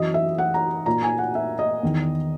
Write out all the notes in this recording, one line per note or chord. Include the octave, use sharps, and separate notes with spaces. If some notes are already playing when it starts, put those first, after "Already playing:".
Already playing: F#2 E3 D#5
E5
F#5
A#5
A#2 A#5
G#5
F#5
E5
D#5
E2 D#3